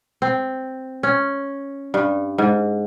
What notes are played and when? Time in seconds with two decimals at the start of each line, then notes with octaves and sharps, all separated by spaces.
0.22 C4
1.03 C#4
1.94 G2
2.38 G#2